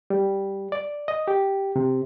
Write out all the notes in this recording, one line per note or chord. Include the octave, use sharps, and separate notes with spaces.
G3
D5
D#5
G4
C3